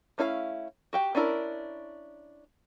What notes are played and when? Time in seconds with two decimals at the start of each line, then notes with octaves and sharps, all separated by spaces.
0.18 A3 C#4 E4 B4 F5
0.93 F#4 G4 G5
1.15 C#4 D4 E4 G#4 A#4